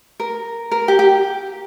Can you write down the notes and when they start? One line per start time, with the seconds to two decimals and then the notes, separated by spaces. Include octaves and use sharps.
0.20 A#4
0.71 A#4
0.88 G4
0.99 G4